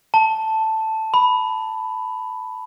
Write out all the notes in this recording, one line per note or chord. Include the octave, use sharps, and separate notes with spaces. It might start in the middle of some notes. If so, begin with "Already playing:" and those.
A5
B5